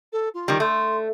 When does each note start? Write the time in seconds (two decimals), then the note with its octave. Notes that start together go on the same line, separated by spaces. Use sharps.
0.12 A4
0.34 F4
0.48 D#3 G3
0.60 A3 C6